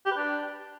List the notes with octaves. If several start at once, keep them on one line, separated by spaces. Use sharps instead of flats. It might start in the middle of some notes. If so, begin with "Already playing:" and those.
G4
B4
D4